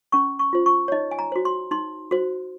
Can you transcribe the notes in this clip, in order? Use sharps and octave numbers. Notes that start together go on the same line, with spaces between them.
C#4 C#6
C#6
F4 C5
C#6
C#5
D#4 D#5
G#5
A#5
F#4 C5
C6
D#4 C6
F#4 C5